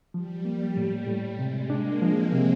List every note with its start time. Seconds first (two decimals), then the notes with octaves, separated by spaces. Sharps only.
0.14 F3 G3
0.45 A#3
0.77 A2
1.07 A2
1.39 C3 G#3
1.70 A#3 D4
2.01 F3 C4
2.32 C3